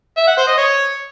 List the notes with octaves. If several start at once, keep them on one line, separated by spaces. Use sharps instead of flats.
E5
F#5
C5
D#5
C#5